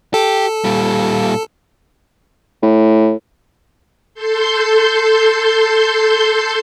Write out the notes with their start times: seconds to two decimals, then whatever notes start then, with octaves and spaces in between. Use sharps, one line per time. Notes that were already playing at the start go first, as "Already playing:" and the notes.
0.14 G4 A4
0.64 A#2 G3
2.63 A2
4.14 A4 C6 G6